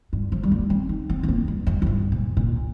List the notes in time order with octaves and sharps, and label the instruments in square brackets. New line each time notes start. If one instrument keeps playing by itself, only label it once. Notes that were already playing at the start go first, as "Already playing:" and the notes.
[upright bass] G2
F3
G3
A#3
C4
D#4
C4
C4
A#3
G2
F2
F2
G2
A#2
A#2